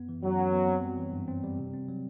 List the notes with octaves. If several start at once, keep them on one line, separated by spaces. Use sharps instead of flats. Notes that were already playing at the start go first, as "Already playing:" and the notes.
Already playing: F#2 B3
E3
F#2 F#3
F#2
B3
C4
G3
E3
G2
C4
G3
C3
C4
F#3